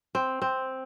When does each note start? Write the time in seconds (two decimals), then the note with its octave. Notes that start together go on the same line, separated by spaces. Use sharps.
0.15 C4
0.42 C4